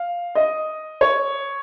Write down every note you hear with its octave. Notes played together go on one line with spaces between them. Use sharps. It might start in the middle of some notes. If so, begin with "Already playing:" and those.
Already playing: F5
D#5
C#5